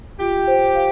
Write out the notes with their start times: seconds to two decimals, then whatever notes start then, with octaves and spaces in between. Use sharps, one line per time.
0.20 F4 G4
0.48 C5
0.75 F5